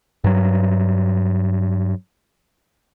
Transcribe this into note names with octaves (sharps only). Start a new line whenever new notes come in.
G2 F#3